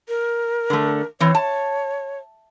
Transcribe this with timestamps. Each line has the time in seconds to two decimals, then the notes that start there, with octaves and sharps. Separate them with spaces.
0.08 A#4
0.70 D3 A3
1.20 E3 C4 C#5
1.35 A5